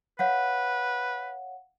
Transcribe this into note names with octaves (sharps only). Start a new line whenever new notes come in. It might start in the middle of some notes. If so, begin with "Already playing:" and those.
B4 C#5 F5 F#5